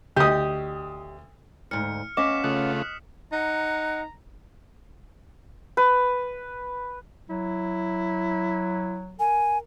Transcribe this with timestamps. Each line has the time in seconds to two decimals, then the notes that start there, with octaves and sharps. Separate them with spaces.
0.16 D2 G4 D#5 D#6
1.71 D2 G#2 F6 C#7
2.17 B3 C#4 D#5 F5 D6 B6 E7
2.44 C#3 A3 F4 D#6 F#6
3.32 D#4 F#5 A#5 F#6
5.77 B4
7.30 F#3 E4
9.20 A#4 G#5